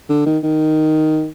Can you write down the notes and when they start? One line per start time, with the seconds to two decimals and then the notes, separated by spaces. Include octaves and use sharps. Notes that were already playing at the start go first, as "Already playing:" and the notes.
0.09 D3
0.26 D#3
0.43 D#3